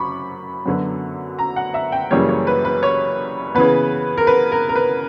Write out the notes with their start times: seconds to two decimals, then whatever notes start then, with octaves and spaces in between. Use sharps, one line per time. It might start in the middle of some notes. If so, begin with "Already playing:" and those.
Already playing: F#2 B5 C#6 D6
0.66 F#2 D3 F#3 B3
1.39 A#5
1.56 F#5
1.74 E5
1.92 G5
2.11 F#2 C#3 E3 G3 A#3 C#5
2.29 C#5
2.47 B4
2.65 B4
2.83 C#5
3.55 C#3 E3 B3 B4
4.17 A#4
4.27 B4
4.52 A#4
4.69 A#4
4.76 B4